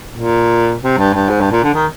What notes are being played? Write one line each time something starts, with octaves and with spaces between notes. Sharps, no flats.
A#2
C3
G2
G2
G#2
G2
A#2
D3
D#3